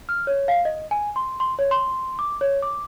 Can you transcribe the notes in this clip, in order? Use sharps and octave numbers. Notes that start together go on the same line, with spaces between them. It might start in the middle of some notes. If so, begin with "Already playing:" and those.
F6
C#5
F5
D#5
G#5
C6
C6
C#5
C6
D6
C#5
D6